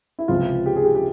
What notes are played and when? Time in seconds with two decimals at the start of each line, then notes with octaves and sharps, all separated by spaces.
0.19 E4
0.28 C#2 C3 F3 F4
0.66 G4
0.76 G#4
0.84 G4
0.95 G4